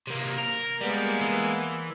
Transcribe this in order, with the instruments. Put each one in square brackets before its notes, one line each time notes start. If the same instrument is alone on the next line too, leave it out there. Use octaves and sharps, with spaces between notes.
[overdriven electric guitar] C3 A#3
A#4
[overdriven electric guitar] G3 [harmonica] G#3 A#3 B3
[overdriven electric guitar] E3